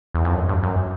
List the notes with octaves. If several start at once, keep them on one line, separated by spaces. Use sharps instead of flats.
E2
F2
F#2
G2
F#2